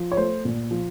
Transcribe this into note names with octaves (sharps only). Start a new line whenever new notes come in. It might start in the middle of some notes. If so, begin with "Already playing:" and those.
Already playing: F3
C#5
A3 C5
A#2
F3